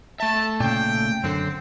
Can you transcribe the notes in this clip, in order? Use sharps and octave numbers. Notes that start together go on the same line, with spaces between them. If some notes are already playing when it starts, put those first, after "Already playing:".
A3 E5 A5
A#2 C#3 G5
F#2 D3 C4